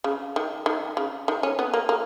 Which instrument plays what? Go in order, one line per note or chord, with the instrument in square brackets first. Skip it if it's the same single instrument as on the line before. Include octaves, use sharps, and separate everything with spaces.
[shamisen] C#3
D#3
D#3
C#3
D#3
C#4
B3
A#3
A#3